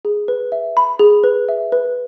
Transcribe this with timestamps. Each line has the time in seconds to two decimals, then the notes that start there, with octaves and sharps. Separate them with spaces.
0.05 G#4
0.28 B4
0.52 E5
0.77 B5
0.99 G#4
1.24 B4
1.49 E5
1.72 B4